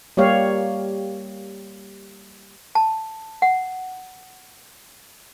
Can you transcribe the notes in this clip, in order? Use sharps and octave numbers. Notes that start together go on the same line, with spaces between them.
G3 A#3 G4 C#5 F5
A5
F#5